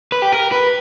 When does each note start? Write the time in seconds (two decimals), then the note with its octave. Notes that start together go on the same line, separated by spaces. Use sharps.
0.12 B4
0.22 G4
0.33 A#4
0.52 B4